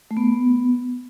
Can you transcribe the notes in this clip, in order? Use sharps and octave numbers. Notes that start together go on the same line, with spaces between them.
A3
B3